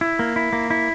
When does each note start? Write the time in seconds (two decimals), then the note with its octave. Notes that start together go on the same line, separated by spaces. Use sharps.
0.01 E4
0.19 A#3
0.36 E4
0.53 A#3
0.70 E4